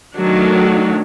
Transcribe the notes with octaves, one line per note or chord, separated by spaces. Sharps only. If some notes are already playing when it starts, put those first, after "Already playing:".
D#3 F#3 A3 D4